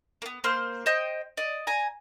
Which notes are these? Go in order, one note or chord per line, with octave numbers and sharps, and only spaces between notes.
A#3 B3
A#3 C5 C6 F6
C5 D#5 G5
D5 D#5
G#5 A#5